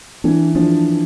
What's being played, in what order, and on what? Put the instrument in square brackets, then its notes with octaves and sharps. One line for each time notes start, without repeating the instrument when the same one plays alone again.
[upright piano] E3 [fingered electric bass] D4
[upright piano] F3 [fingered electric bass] D4